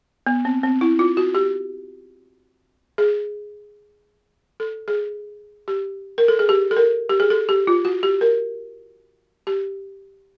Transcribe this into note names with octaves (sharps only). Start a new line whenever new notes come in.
B3
C4
C4
E4
F4
F#4
G4
G#4
A4
G#4
G4
A#4
A4
G#4
G4
A4
A#4
G4
G#4
A4
G4
F4
F#4
G4
A#4
G4